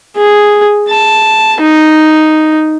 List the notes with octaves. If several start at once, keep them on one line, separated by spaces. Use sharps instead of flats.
G#4
A5
D#4